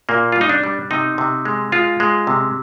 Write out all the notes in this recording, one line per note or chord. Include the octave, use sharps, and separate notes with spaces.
A#2 A#3
G3 F4
D#4
D4
G3
C3 D#4
C3
G#3
G#3 F4
G#3
C3